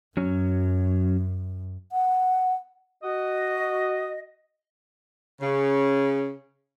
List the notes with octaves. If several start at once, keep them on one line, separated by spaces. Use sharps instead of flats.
F#2 F#3 C#4 C#5
F#5
F#4 D#5
C#3